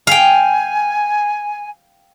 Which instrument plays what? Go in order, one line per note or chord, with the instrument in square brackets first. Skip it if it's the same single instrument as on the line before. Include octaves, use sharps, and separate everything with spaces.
[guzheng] F5 G5 [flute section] G#5